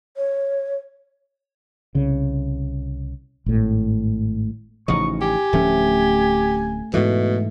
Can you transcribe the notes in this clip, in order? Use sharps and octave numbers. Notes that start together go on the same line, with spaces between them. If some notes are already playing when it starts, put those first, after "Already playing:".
C#5
C2 C#3
G#1 A2
A1 C#3 F3 D#4 C#6
G4 G#5
D1 F3 A3 C#4
G#2 B2 E3 A3